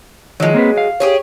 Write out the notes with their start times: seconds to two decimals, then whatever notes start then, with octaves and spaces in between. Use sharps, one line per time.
0.40 D#3 F3 F#3 G#3
0.54 A#3 C4 B4
0.78 F5
1.00 G4 G#4 C#5